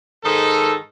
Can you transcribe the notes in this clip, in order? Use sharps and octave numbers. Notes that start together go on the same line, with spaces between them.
G#2 D#3 D#4 A4